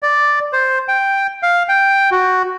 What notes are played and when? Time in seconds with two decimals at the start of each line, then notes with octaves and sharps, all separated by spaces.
0.03 D5
0.53 C5
0.88 G5
1.43 F5
1.69 G5
2.11 F#4